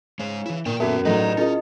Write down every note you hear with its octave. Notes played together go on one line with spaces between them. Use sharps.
C#3 G#3 C5
E3 E4
A#2 A#4 G5
F#2 A3 B3 C#4 F#4 A#4
A2 F#3 D#4 B4 C#5 D5
C#4 E4 F4 G#4 A#4 D#5